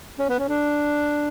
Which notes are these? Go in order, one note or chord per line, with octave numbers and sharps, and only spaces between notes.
C#4
B3
C#4
D4